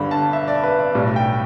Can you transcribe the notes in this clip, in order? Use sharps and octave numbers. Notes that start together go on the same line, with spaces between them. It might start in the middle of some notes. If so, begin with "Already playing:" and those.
Already playing: G1 G2 D3 G3 B5
A5
E5
D5
B4
D5
B1 A2 G3
G5